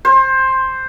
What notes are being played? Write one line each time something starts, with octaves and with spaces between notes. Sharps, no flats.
C5